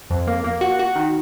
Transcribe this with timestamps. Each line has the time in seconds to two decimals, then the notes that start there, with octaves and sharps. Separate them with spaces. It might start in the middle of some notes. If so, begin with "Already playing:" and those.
0.10 F2
0.27 A#3
0.44 A#3
0.61 F#4
0.79 F#4
0.96 D#3